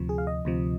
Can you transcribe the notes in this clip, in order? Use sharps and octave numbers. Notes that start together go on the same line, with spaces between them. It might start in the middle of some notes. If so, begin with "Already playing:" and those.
Already playing: D2 C3 F3
G#4
F5
D#5
D2 C3 F3